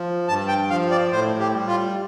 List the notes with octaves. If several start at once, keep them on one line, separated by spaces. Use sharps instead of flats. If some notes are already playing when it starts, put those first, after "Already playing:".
Already playing: F3
G2 A5
G5
F3 F5
D5
A2 C5
G4
G3
F4